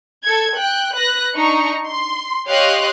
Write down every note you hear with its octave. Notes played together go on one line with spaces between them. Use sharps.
A4 G#6
G5 F#6
B4 F#6 A#6
D4 D#4 A#5 C#6
C6
G4 C#5 D#5 F5 C6 F#6